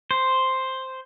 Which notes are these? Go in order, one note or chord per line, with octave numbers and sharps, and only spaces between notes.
C5